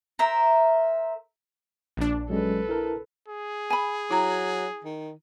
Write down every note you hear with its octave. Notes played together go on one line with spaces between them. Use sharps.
A#4 C5 E5
A#1 D4
F#3 G#3 C#4 A4 B4
E4 A#4 A5
G#4
G#5 B5
F#3 E4 A#5
D#3